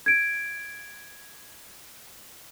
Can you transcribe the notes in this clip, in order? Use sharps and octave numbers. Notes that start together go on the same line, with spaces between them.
G#6 D7